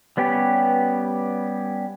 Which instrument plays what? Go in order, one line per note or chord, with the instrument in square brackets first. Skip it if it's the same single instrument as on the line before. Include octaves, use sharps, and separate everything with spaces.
[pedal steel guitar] G3 B3 C#4 G4